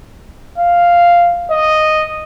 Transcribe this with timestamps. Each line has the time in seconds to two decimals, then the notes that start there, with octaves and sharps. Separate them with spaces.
0.58 F5
1.51 D#5